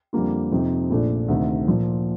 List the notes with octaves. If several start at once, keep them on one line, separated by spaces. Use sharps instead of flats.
F2 D3 G3 A#3 F4
F2 C3 F3 C4 D#4
A#1 A#2 A3 D4 F4
D2 C3 D#3
A#2 F3 A#3